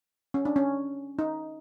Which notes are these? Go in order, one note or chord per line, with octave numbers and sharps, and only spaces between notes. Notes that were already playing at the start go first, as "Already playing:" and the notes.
C#4
D4
C#4
D#4